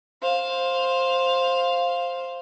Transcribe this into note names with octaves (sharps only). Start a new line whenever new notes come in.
C5 F5